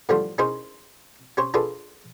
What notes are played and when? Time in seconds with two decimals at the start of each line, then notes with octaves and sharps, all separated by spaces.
0.09 A2 D3 F3 G3 D4 F4
0.38 C#4 D#4 E4 G#4 A#4 C5
1.37 C#4 G4 C5 C#5
1.54 D4 F4 G#4 A4 B4 D5